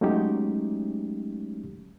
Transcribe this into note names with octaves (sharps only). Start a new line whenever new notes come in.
F#3 G#3 A3 C#4 D#4 G4